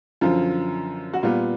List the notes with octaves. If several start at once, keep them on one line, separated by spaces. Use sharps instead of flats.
F#2 D3 F3 F4
F#4
A#2 G3 B3 F4